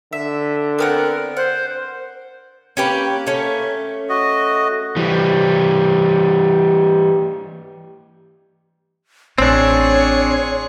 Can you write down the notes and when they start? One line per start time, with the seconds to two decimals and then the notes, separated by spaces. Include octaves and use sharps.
0.13 D3 E5
0.78 B3 C4 A#4 F#5
1.37 C5 F#5
2.77 A#3 C#4 G4 B4
3.27 A3 C#4
4.09 F#4 D#5
4.96 E3 G3
9.38 A1 C4 D4 G#4 C#5 C#6